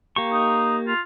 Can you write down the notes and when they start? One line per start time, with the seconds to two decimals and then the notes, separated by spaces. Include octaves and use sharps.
0.16 A#3 G4 C#6
0.32 D#4
0.87 F4